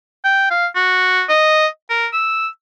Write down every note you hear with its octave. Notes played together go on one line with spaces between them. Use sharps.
G5
F5
F#4
D#5
A#4
E6